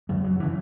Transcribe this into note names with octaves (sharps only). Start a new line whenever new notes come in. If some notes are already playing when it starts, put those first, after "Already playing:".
F#2 C#3 G#3
F#3
C#3 E3